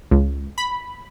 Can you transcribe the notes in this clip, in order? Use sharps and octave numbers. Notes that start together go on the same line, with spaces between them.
C#2
B5